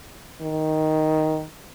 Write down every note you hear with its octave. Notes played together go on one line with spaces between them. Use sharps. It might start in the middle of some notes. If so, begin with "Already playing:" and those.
D#3